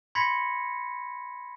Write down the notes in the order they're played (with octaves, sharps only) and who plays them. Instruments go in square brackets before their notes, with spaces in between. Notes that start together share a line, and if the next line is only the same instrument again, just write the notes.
[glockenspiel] B5 C6 G#6 A#6 B6 C#7